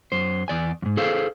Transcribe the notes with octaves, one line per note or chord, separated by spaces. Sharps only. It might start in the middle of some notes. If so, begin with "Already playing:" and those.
F#2 C5
E2 D5 G#5
F2 G#2
G#4 A4 C5 F5